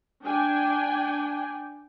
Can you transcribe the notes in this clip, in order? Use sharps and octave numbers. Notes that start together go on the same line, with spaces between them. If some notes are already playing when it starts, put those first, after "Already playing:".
D4 G5 G#5